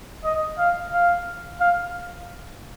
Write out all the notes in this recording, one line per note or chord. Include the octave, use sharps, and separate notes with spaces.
D#5
F5
F5
F5